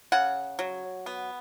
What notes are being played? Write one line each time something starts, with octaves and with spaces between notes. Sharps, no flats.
C#3 F#5
F#3
B3